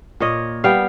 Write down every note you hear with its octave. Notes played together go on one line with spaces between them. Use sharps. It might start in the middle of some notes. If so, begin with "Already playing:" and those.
A#2 C#5 D#5
G3 B3 F5 G5